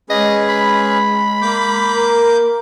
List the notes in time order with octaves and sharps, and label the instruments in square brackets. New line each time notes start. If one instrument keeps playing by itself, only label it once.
[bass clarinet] G#3 [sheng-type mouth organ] C#4 G#4 B4 [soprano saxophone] D#5
[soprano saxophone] B5
[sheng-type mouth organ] A#3 D6 G6
[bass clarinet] A#4